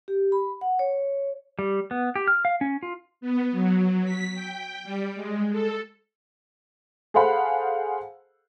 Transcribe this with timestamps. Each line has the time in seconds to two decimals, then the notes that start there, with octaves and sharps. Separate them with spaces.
0.08 G4
0.32 B5
0.61 F#5
0.79 C#5
1.59 G3
1.91 B3
2.16 G4
2.28 F6
2.45 F5
2.61 C#4
2.83 F4
3.21 B3
3.52 F#3
4.05 B6
4.34 G5
4.84 G3
5.15 G#3
5.51 A4
7.14 G#4 A4 C5 F5 F#5 B5